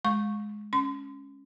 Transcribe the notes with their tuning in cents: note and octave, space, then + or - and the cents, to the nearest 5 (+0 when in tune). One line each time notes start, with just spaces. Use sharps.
G#3 +10 C#6 -10
C#4 +0 C6 -35